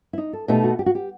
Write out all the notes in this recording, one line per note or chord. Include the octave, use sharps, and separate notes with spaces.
E4
D#4
A4
B2 A3 D#4 G4 A4
F#4
G4
F#4
G4